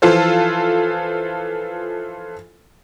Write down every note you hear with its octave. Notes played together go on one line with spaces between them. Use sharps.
E3 F3 F4 A4 C5